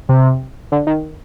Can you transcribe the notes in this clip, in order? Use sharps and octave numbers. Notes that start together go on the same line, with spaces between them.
C3
D3
D#3